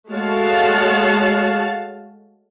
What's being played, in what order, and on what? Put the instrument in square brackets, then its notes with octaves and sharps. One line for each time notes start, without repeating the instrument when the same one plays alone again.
[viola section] G#3 A3 F#4 C#5 F5 A5